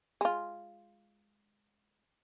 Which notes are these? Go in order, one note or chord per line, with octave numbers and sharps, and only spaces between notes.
G#3 F4